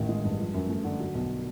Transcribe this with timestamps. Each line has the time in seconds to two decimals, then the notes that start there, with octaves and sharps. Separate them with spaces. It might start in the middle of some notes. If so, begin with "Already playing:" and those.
Already playing: A1 D#3
0.09 G#3
0.25 G2
0.40 F3
0.54 F#2
0.69 A3
0.84 D3
1.00 F#3
1.15 B1